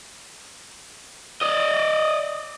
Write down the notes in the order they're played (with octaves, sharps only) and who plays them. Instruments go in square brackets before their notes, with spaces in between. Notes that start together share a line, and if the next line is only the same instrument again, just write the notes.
[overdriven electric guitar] D5 D#5